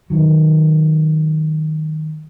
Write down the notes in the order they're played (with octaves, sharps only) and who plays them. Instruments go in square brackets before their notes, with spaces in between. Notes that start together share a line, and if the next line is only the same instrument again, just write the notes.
[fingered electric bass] D#3 F#3